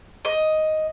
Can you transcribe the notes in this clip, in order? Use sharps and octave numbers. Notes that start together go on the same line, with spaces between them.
D#5